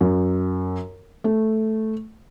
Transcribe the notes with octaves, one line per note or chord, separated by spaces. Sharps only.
F#2
A3